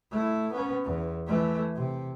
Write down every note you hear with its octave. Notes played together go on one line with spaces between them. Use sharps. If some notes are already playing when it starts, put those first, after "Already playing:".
A3 E4
B3 C#4
E2
E3 A3
C3